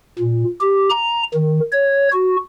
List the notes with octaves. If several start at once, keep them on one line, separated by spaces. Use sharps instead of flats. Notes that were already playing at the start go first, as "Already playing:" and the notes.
A#2
G4
A#5
D#3
C#5
F#4